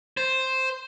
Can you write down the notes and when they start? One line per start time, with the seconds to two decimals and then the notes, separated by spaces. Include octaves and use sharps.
0.17 C5